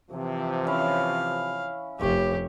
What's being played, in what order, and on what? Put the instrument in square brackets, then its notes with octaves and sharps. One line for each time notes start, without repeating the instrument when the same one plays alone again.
[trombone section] C3 F3 [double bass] E3
[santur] C#4 E4 [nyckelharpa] F5
[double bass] F1 [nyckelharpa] G4 [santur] C#5